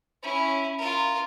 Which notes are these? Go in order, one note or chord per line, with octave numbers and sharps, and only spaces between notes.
C#4 E4
F4 A#4